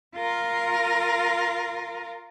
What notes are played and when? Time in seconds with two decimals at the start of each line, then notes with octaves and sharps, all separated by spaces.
0.15 F4 A#4